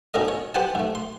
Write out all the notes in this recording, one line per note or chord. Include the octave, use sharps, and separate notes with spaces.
G#2 B2 C#4 A4 A#4 D#5
C#5
G4 B4 C5 F#5 G#5 A5
G#2 A3
C6